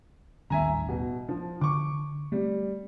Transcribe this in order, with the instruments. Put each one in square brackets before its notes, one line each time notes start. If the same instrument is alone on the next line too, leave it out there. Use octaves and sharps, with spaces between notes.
[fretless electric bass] D#1 A1 D#3 [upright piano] E5 G#5 A#5
[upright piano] B2
[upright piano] F3 [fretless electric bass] D4
[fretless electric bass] D3 [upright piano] C#6 D6
[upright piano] G3 [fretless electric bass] A3 C4